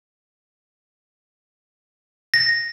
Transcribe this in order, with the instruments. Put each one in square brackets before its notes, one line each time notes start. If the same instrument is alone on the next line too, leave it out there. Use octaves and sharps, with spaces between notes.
[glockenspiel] A#6